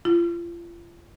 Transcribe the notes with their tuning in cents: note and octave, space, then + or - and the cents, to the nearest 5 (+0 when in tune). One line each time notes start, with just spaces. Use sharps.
F4 -35